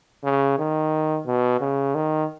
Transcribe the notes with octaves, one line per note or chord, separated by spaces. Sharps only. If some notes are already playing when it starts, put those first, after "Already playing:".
C#3
D#3
B2
C#3
D#3